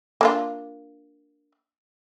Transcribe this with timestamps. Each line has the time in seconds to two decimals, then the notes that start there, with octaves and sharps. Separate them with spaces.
0.21 A#3 D4 F4